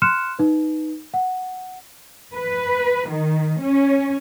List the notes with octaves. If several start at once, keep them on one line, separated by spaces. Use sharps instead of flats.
C6 F6 F#6 C#7 E7
D#4 B4
F#5
B4
D#3
C#4